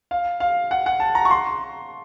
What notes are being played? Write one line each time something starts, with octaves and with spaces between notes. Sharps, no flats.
F5
F5
F#5
F#5
A5
A#5
C#6
C6